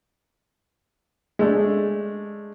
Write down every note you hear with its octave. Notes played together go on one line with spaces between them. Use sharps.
G#3 A3 D4